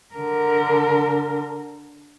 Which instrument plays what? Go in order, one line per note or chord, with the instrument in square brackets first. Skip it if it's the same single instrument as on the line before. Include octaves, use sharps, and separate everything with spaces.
[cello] D3 A#4